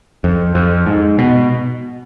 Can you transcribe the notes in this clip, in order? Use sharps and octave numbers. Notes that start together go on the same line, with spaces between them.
F2
F2
G#2
B2